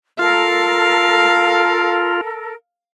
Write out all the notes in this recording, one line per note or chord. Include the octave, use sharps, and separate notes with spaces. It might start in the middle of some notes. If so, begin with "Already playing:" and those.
F4 A4 A#4 F5